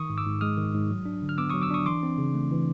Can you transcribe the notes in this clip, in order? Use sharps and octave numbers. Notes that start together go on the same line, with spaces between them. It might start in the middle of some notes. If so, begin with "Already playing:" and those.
Already playing: D#3 C#6 D#6
G#2
D6 E6
G#2
G#3 D#6 F6
D#3
G#2
F#3
D4
D3
F6
B3 D6 E6
F#3 C#6 D#6
D6 E6
D4 C#6 D#6
E3 C6 D6
C4
C#3
A3
E3